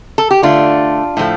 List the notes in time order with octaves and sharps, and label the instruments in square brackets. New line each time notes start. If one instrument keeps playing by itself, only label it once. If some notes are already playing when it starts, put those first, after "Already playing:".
[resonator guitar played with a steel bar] A4
G4
D3 A3 D4 F4
A2 F3 A3